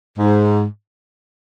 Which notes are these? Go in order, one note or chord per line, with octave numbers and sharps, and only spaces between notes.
G#2